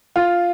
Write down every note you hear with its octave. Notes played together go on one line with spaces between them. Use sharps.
F4